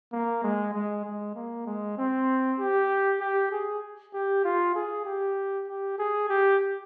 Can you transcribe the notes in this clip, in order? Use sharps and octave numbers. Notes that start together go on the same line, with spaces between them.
A#3
G#3
G#3
G#3
A#3
G#3
C4
G4
G4
G#4
G4
F4
G#4
G4
G4
G#4
G4